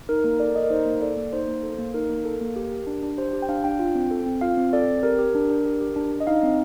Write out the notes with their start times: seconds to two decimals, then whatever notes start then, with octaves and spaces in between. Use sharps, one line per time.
0.09 D#4 A#4
0.24 A#3 A#4
0.40 A4 D5
0.55 A#3 D#5
0.64 A#4
0.70 D#4 C5
0.86 A#3
1.02 A4 D5
1.17 A#3
1.33 D#4 C5
1.48 A#3
1.63 A4
1.79 A#3
1.94 D#4 A#4
2.10 A#3
2.25 A4
2.41 A#3
2.56 G4
2.72 G4
2.87 D4
3.03 D4
3.18 G4 C5
3.33 G4
3.42 G5
3.49 D4 F5
3.64 D4 G5
3.79 F4
3.95 C4
4.11 A4
4.26 C4
4.41 F4 F5
4.57 C4
4.73 A4 D5
4.88 C4
5.03 G4 A#4
5.19 G4
5.35 D4
5.50 D4
5.65 G4
5.81 G4
5.96 D4
6.12 D4
6.20 D#5
6.27 D#4 F5
6.43 C4